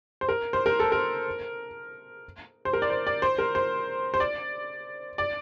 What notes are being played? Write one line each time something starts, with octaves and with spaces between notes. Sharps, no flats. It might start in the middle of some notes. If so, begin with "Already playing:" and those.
C5
A#4
C5
A#4
A4
A#4
C5
A#4
D5
C5
D5
C5
A#4
C5
C5
D5
D5